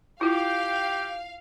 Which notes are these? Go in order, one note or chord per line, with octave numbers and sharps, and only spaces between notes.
E4 F4 G4 F5 G5